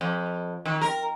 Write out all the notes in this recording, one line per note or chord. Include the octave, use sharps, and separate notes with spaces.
F2
D#3
A#4